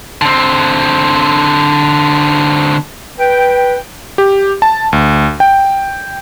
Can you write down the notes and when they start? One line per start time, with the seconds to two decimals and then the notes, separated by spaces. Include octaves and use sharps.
0.22 D3 C4
3.19 B4 G5
4.18 G4
4.62 A5
4.93 D2
5.40 G5